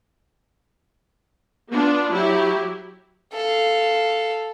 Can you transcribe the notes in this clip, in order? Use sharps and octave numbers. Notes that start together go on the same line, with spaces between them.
B3 D4 F4
F#3 E4 G4
A4 F5